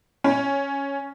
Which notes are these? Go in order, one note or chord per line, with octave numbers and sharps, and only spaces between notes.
C#4